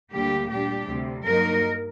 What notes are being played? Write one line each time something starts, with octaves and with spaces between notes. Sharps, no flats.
D2 D3 G3 A#3 G4
A#2 G3 D4 G4
D2 C3 G3
G2 F#3 A#3 D#4 A#4